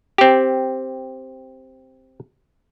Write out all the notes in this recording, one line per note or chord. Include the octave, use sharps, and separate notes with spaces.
C4 G4